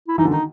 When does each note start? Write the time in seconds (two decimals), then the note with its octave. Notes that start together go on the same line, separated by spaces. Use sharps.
0.08 E4
0.18 E3 D#4
0.25 D3
0.31 D#3 D#4